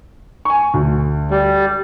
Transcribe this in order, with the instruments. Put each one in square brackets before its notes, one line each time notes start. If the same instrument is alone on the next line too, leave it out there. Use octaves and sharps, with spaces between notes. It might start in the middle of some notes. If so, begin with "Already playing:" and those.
[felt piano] G#5 C#6
D2
[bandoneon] G3